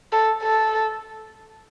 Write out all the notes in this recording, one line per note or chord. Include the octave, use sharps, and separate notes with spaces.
A4
A4